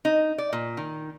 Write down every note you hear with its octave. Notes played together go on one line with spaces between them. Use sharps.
D#4
D5
A#2
D#3